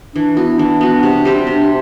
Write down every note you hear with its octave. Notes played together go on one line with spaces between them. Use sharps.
E3 D4
B3 E4 F#4
E3 D4
B3 F#4
C3
G3 C4 G4
C3 D4